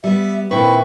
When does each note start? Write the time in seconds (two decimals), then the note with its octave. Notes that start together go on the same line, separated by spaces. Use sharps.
0.04 G3 B3 E5
0.51 A#2 D#3 C4 E4 B4 C#6